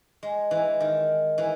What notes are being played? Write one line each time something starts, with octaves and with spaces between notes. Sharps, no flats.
G#3
E3
D#3
E3